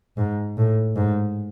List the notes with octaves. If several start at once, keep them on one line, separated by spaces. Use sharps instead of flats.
G#2
A2
G#2